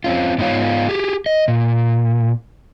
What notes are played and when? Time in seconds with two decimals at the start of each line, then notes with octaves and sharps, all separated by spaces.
0.04 C4 C#4 F4
0.38 G#2 B3 D#4 F4 C#5 F5
0.89 G4 G#4
1.26 D#5
1.48 A#2